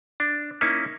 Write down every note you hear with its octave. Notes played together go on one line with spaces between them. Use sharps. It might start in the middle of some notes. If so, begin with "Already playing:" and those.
D4
A#3 C#4 D#4 E4